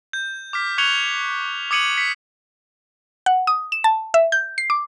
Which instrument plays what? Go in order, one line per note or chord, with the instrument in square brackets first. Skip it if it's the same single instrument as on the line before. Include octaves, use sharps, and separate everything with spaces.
[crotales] G6
D6 F6 B6
C#6 F#6 G#6 C#7 F7 G7
D6 D#6 G#6 C#7 D#7 F#7
B6 C#7
[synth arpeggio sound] F#5
D#6
E7
A5
E5
G6
C7
D6